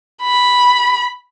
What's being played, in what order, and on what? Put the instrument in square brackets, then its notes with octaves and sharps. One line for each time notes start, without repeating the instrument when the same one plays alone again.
[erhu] B5